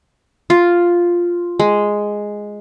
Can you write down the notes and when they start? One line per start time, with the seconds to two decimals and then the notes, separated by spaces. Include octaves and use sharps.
0.50 F4
1.59 G#3